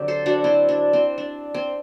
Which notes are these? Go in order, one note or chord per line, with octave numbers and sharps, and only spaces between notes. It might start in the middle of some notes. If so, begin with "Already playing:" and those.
Already playing: D3 F#3 C4 G4
A4 C5
D4 F#4
C4 E4
D4
C4
D4
C4